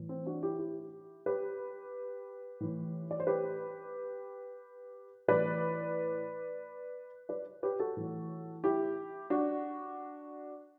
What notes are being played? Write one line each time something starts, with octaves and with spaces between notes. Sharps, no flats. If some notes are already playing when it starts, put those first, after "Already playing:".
Already playing: A2 E3
C4
D4 F#4
E4 G4
E4 G4
G4 B4
A2 E3
D5
C5
G4 B4
A2 E3 B4 D5
B4 D5
G4 B4
F#4 A4
A2 E3
E4 G4
D4 F#4